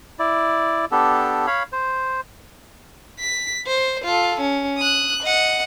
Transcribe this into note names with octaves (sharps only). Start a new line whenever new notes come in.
E4 D5
B3 D4 G4 A4
C#5 F5 B5
C5
B6
C5
F4 A4
C#4
D#6 F#6
D#5 F#5